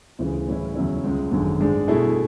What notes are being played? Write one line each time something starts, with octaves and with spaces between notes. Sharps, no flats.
D2 C#3 E3 G#3
A2 E3 G#3 C#4 E4
E2 C#3 F#3 C#4 E4
C#2 C#3 G#3
G#1 F#2 D3 G#3
G#2 G#3 D4
B2 A3 E4 G#4